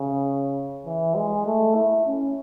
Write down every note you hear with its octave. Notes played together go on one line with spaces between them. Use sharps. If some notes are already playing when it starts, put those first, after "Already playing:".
Already playing: C#3
E3
G#3
A3
E4
C#4